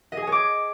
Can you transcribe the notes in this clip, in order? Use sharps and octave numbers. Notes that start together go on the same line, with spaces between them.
D#5
G#4
G#5
C#5
D6